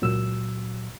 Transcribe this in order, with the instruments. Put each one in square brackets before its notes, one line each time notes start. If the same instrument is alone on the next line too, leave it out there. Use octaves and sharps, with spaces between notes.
[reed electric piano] C#2 A#2 F#3 E6